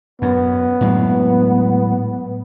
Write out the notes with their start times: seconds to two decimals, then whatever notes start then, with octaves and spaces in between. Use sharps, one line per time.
0.22 F#2 B3
0.81 A2 F#3 G#3